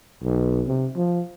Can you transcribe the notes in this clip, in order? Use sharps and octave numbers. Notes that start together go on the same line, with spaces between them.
B1
C3
F3